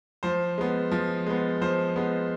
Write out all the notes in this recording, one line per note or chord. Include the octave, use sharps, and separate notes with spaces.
F3 C5
G#3 B3
F3
G#3 B3
F3 C5
G#3 B3